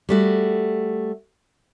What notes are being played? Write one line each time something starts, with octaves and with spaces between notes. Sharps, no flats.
G3 A3 F#4